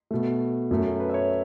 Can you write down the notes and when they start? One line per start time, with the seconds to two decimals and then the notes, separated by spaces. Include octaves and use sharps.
0.11 B2 A3
0.71 F#2 F#3 A3
1.00 B4
1.09 E5
1.14 C#5